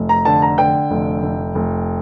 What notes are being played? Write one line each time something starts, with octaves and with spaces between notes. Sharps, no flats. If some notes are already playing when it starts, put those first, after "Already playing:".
Already playing: F1
A#5
D3 A5
A#5
D3 G5
F1
F1
F1